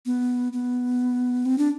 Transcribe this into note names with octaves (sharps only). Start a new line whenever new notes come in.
B3
B3
C4
D4